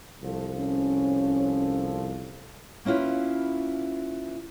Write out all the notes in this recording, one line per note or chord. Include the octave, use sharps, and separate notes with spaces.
C2 F3 A4
C#4
A#3 C#4 E4 F4 B4